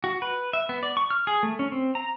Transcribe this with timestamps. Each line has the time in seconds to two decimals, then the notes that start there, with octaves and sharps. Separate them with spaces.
0.04 F#4
0.22 B4
0.53 E5
0.69 B3
0.83 D5
0.97 C#6
1.10 F6
1.27 G#4
1.43 A3
1.59 C#4
1.72 C4
1.95 A#5